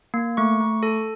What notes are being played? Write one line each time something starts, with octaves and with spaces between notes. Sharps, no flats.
A#3
A3 C#6
A3
A4